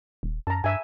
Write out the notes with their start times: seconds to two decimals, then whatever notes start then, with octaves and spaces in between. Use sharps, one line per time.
0.23 D#1
0.47 F#2 A5 A#5
0.64 G2 E5 G#5